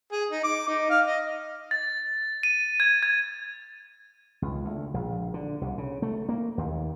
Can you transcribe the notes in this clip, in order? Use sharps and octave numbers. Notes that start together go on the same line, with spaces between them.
G#4
D#4
D6
D#4
F5
D#5
A6
D#7
G#6
G#6
C#2
D2
A#1
D3
C2
C#3
A3
A#3
D#2